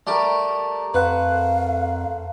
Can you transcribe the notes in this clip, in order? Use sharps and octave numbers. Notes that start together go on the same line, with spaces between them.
G3 A3 G4 A#4
F2 B4 C5 F5 F#5